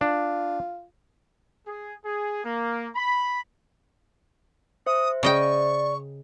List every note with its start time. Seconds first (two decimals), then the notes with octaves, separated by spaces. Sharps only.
0.01 D4 F4
1.67 G#4
2.04 G#4
2.45 A#3
2.95 B5
4.86 C5 E5 D#6
5.23 C#3 D5 D#5 G5 C#6